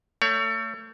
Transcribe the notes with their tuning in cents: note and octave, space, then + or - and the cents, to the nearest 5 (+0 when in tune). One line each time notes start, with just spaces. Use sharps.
A3 +30 C#5 +25